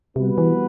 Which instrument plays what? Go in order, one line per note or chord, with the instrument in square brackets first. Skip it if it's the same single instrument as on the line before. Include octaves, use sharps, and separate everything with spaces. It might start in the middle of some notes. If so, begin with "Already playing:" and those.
[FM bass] C3 [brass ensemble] G3 B3 F#4 B4
[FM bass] E3